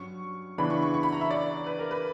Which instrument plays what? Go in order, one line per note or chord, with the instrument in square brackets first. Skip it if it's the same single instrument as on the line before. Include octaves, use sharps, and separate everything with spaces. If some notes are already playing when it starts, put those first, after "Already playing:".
Already playing: [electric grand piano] G2 F#3 C#4 [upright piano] C#6
[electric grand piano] C#3 E3 B3 D4 [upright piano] B5
[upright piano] C#6
C#6
C#6
B5
A#5
E5
D5
B4
A#4
B4